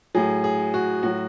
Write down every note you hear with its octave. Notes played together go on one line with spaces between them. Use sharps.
A2 F#3 G#4
G#4
F#4
A2 F#3 F#4